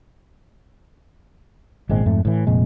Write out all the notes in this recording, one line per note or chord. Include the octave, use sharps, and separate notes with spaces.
G#1 A#2 G#3 C4
F2 G#2 A3
A2 E3
F1 F2 A#2 G#3